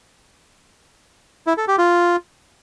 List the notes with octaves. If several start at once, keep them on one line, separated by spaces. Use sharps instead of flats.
E4
A4
G4
F4